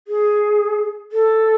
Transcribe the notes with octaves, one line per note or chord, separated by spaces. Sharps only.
G#4
A4